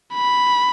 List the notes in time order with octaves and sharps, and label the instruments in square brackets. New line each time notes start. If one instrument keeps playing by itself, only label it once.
[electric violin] B5